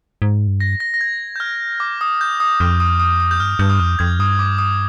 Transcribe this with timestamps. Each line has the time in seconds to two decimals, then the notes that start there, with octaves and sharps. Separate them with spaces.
0.22 G#2
0.47 G2
0.60 A#6
0.80 A#6
0.94 A#6
1.01 G#6
1.36 G6
1.40 F6
1.80 D6
2.01 D#6
2.21 G6
2.40 D#6
2.60 F2 F6
2.80 D#6
2.99 D#6
3.20 D#6
3.31 G6
3.40 G2 F6
3.59 G2 G6
3.70 D#6
3.79 F2 F6
3.99 F2 G#6
4.19 G2 D#6
4.39 D6
4.59 D#6